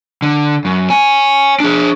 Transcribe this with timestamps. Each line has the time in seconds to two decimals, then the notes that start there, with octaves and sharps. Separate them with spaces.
0.22 D3
0.65 F#2
0.90 C#5 G#5
1.60 D4 G#4